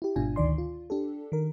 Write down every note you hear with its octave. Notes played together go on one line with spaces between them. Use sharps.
E4 G4
G#1 G#2 B2 D4 F4 G#5
D2 D#3 D5 C6
F4
D4 G4 A4
D#3 A#4